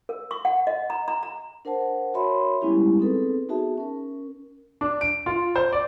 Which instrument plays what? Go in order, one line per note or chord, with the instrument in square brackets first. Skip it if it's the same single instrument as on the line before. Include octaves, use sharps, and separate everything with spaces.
[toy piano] A#4
C#6
F#5
D#5
A#5
A#5
A#5
[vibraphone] D4 A#4 C5 F#5 A5
F#4 A#4 C#5 E5 B5 C6
G3 G#3 B3 C#4 E4 G4
B3 C4 D#4 G#4 A4 B4
B3 D#4 F#4 G#4 E5 A5
C#4 A#4
[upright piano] D4
D7
F4
C5
D5